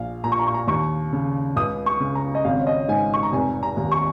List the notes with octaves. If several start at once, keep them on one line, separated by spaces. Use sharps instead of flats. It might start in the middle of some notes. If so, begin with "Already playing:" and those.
Already playing: A#1 F5
A#2 A#5
C#6
A#5
C#6
A#5
D#2 C#6
C#3
C#2 D#6
C#6
C#3
A#5
D#5
G#1 F5
C#5
D#5
G#2 G#5
C#6
A#5
F1 G#5
A#5
D#2
C#6